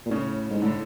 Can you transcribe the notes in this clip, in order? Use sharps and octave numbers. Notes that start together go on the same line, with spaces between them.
A#2
A2 C#3 C#4
G#2
A2 D3 D4